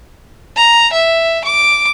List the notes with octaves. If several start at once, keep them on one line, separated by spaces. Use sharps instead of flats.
A#5
E5
D6